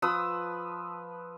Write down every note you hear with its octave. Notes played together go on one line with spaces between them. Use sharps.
F3 B4 D#6 E6